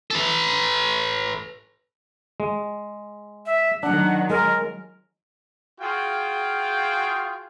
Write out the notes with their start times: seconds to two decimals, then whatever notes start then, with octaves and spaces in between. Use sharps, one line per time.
0.10 A4 B4
2.40 G#3
3.46 E5
3.83 D#3 F#3 D4 F#5
4.30 G#3 A#4
5.80 F4 F#4 G#4 F5 G5